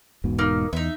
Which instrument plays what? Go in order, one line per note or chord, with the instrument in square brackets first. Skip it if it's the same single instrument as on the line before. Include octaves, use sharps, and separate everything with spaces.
[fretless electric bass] E1 G#2 B2
[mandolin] A#3 D#4 F6
[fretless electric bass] E2 [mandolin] D#4 E5